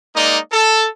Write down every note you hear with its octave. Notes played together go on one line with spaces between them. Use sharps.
G#3 A#3 D#4 D5 D#5
A4